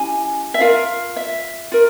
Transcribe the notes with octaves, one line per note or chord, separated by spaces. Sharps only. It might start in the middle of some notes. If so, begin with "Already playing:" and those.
Already playing: C#4 E4 G4 G#5
E5
F4 A#4 F5
E5
F4 A#4